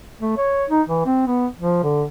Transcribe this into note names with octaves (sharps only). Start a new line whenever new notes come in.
A3
C#5
D#4
E3
C4
B3
F3
D3